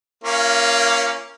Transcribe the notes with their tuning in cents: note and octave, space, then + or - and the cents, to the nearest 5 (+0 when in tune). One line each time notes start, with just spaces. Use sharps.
A#3 +0 C#4 +0 F4 -40